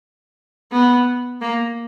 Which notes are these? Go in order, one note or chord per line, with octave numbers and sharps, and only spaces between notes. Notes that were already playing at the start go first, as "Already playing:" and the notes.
B3
A#3